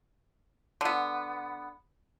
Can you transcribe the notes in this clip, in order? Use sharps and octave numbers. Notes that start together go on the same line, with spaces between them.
D3 B3